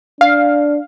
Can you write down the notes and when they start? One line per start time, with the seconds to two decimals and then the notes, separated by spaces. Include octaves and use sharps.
0.21 D4 F5